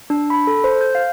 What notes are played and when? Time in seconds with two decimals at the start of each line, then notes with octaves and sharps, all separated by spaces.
0.10 D4
0.30 B5
0.47 A4
0.64 C5
0.81 G6
0.95 F5